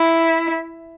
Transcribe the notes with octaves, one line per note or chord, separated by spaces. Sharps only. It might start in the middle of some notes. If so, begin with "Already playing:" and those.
Already playing: E4